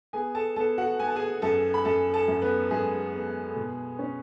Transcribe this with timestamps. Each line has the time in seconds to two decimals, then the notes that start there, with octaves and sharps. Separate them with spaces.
0.13 B3 G#4 G#5
0.35 A4 A5
0.56 B3 A4 A5
0.78 F#4 F#5
0.99 B3 G#5
1.08 A5
1.15 G#4 G#5
1.42 F#2 A4 A5
1.74 B5
1.85 F#2 A4 A5
2.14 A4 A5
2.28 F#2
2.42 B3 B4
2.70 F#2 G#3 G#4
3.14 B3
3.56 B2
3.99 C#4